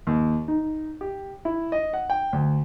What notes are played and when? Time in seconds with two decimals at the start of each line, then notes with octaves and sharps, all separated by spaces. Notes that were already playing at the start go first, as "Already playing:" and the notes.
0.07 D#2
0.48 D#4
1.01 G4
1.45 E4
1.72 D#5
1.93 F#5
2.10 G5
2.33 D2